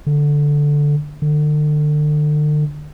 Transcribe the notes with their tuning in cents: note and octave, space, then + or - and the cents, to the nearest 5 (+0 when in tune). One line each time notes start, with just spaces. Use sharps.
D3 -5
D3 +35